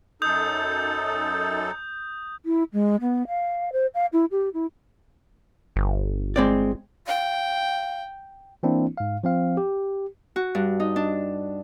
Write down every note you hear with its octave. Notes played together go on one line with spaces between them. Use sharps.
F#2 D#4 A4 D#6 G6
E4
G#3
B3
F5
C5
F5
E4
G4
E4
G1
G#3 C4 D5
F5 G5
E3 A#3 C4 D4 E4
G#2 F5
F3 C4 F5
G4
F#4
G2
D#4
D4